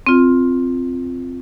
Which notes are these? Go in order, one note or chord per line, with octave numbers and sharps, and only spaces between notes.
C4 F4